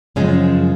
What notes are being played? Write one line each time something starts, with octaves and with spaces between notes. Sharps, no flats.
F#2 C#3 F3 G#3 C#4